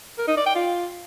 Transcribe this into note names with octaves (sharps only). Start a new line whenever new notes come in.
A#4
D#4
D5
G5
F4